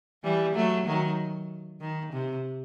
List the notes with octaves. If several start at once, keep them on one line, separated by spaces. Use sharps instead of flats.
E3 G3
F#3 A3
D#3 F#3
D#3
C3